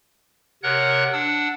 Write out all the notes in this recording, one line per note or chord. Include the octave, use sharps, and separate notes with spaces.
C3 A#4 C#5 F#5 F#6
D4 F#5 E6